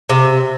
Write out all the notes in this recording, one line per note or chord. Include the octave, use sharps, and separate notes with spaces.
C3